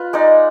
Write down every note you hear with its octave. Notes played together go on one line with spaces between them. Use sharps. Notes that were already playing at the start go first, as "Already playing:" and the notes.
Already playing: F4 B4
G#3 D#4 D5